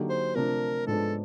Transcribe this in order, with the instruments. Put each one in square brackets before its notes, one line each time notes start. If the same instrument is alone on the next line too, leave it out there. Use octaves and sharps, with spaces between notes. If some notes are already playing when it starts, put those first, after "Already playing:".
Already playing: [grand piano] D3 F#3 A#3 D#4 G4
[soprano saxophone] C5
[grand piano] C3 F3 A3 D4 [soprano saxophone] A#4
[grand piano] G#2 F3 G#3 B3 D4 [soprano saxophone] A4